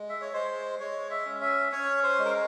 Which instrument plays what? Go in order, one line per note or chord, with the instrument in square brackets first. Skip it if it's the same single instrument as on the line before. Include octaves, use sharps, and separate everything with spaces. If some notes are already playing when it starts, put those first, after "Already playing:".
Already playing: [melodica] G#3
E5
C#5
G#3 C5
G#3 C#5
E5
C#4
E5
C#4 C#5
C5
G#3
A#4